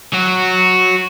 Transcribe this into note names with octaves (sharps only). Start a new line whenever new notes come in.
F#3 F#4